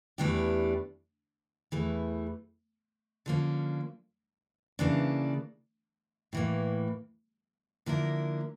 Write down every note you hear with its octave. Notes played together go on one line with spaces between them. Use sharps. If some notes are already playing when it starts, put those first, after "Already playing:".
E2 E3 A3 D4 G4
E2 E3 A3
D3 F3 A#3 C#4
C#3 E3 A#3 D4
A2 E3 A#3
D3 F3 A#3 E4 A#4